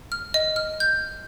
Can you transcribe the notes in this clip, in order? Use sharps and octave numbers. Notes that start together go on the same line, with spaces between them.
F6
D#5
F6
G6